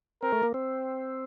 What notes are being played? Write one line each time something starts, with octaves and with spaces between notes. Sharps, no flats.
C4 A#4
A3
A#3
C4